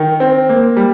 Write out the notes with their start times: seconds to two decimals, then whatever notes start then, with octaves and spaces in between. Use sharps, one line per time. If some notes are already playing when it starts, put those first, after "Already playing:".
Already playing: D#3 A#4
0.20 C4
0.49 A#3
0.77 G3